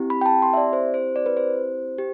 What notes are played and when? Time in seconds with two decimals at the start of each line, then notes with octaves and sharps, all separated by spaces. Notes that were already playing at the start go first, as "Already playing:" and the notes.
Already playing: C4 E4 G4
0.10 B5
0.21 G5
0.26 A5
0.42 C6
0.53 E5
0.57 D5
0.73 C5
0.94 C5
1.16 D5
1.26 B4
1.37 C5
1.98 G4